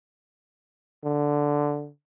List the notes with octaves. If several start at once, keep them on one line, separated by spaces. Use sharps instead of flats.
D3